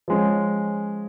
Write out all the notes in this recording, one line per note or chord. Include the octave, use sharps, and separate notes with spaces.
F3 G#3 C#4